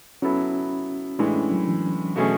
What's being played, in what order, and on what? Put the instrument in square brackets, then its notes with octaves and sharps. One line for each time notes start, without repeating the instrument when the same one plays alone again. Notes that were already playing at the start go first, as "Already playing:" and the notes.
[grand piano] F#3 B3 E4 A4 [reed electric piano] C#4
[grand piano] A2 E3 G#3 [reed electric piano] D4
[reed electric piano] C#4
F#3
E3
[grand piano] B2 A3 C#4 G#4